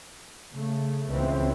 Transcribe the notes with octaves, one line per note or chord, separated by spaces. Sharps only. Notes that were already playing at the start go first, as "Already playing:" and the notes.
C#3 A3
C#2 E3 C4 C#4